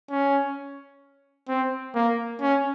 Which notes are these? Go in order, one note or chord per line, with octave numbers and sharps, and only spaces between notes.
C#4
C4
A#3
C#4